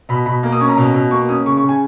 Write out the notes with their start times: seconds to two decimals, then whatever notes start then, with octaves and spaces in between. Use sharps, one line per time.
0.09 B2 B5
0.26 B2 B5
0.43 A#3
0.52 D#6
0.60 C#4 C#6
0.69 A#5
0.77 B2
0.94 B2
1.11 A#3 C#6
1.29 C#4 D#6
1.46 C#3 C#6
1.57 C#6
1.63 C#3
1.69 G#5